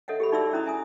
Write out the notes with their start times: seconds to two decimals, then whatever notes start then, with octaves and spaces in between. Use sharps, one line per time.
0.08 A4 C#5 D#5 E5 F#5
0.20 G4 G#4 B5
0.32 D#4 F#4 D5 E5 C6 E6
0.53 C#4 E4 A#5 D#6
0.66 E5 G#5 D#6